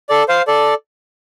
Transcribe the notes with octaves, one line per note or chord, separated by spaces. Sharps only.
A4 D5
C5 F5
A4 D5